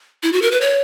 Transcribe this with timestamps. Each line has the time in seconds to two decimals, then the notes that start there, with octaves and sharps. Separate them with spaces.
0.23 E4
0.32 F#4
0.42 A#4
0.51 B4
0.61 C#5